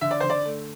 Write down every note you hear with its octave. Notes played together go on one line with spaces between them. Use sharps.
D3 E5
D5
D3 C5
D5
A3